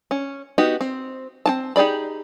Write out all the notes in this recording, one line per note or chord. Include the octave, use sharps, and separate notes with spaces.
C#4
B3 D#4 F#4 G4
C4
C4 F4 A5
D#4 G4 G#4 D5 B5